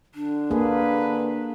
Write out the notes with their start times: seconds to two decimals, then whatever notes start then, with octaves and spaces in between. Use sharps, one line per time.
0.15 D3 D4
0.51 A#3 G#4 B4